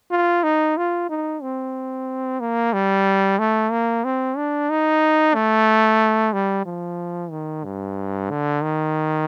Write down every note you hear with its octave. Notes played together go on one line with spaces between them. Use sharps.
F4
D#4
F4
D#4
C4
A#3
G3
A3
A#3
C4
D4
D#4
A3
G3
F3
D#3
G2
D3
D#3